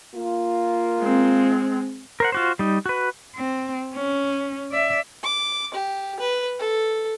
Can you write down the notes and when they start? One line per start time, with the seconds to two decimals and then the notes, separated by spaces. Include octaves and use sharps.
0.14 A#3 F4
0.99 G#3 C4
2.20 A#4 C5 F#5
2.32 F4 F#4 C5
2.59 G3 D#4
2.86 F#4 B4
3.36 C4
3.94 C#4
4.71 D5 E5
5.23 D6
5.74 G4
6.19 B4
6.59 A4